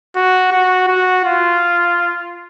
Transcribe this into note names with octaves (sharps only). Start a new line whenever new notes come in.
F#4
F#4
F#4
F4